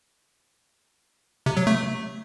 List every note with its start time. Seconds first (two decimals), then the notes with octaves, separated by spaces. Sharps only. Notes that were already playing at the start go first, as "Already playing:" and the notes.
1.46 C3
1.57 F#3
1.67 A3